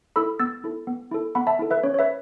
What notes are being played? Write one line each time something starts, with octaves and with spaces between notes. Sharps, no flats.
E4 A4 B5 E6
B3 E6 A6
E4 A4
B3
E4 A4
B3 F#5 B5
E5 A5
E4 A4
B4 E5
C#4 C#5
C#5
B4 E5